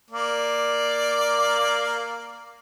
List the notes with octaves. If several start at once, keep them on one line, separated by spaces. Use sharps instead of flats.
A#3 D5